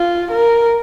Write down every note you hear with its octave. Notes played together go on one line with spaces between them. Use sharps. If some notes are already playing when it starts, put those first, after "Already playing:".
Already playing: F4
A#4